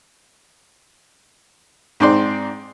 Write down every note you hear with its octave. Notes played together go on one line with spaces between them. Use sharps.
G#2 C4 D5 C6